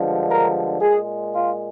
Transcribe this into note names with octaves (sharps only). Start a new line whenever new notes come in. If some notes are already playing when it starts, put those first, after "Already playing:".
Already playing: G2 D3 F3 G#3
A#4
A#2 G#3 G#4
F4